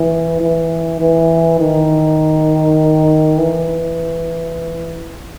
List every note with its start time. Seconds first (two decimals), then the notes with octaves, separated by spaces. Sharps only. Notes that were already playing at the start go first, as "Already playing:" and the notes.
Already playing: E3
0.41 E3
1.00 E3
1.60 D#3
3.38 E3